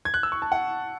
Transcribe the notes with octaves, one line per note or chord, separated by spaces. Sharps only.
G#6
F#6
E6
C#6
A5
F#5